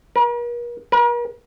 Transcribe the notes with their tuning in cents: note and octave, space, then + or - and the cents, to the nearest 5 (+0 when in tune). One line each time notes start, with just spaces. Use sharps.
A#4 +45
A#4 +45